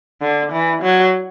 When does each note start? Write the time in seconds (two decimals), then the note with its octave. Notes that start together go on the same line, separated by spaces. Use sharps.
0.22 D3
0.52 E3
0.82 F#3